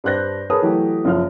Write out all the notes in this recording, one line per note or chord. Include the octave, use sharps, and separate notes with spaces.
G2 D4 C5 F#6 G6 A#6
G#4 A#4 B4 C#5 A5 D#6
E3 F#3 A3 G4 A4
F#1 F3 F6